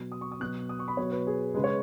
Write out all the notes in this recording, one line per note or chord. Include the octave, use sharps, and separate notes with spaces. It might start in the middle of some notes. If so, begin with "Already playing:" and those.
Already playing: B2 F#3
D#6
C#6
D#6
B2 F#3 F#6
D#6
C#6
B5
B2 F#3 C#5
B4
G#4
C#3 G#3 B4
C#5